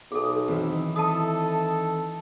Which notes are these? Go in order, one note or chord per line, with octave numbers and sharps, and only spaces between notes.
B1 G#4 A4
D#3 E3 C4
E4 A4 A5 D#6